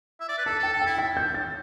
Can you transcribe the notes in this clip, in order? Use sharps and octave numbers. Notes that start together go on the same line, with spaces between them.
E5
D5
B4
A4 A5
A4 G5
A4
E4 G5
A6
G6
A6